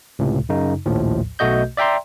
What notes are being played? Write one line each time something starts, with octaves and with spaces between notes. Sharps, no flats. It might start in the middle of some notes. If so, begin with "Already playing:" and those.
C#2 A2 C3
F#2 C#3 D#4
A#1 D#2 A2 F3
B1 B2 A3 F#4 D#5 G6
D5 E5 G5 A#5 C6